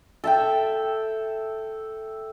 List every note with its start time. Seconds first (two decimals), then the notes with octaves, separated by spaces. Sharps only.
0.24 A4 E5 G5